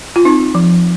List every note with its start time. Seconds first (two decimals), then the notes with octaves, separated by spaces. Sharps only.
0.16 F4
0.25 C4 D#4
0.55 F3